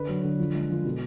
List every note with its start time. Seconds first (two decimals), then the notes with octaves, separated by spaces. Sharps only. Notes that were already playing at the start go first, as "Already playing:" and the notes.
Already playing: D3 B4
0.08 F#3
0.23 D3
0.39 F3
0.53 G#3
0.70 F3
0.85 B2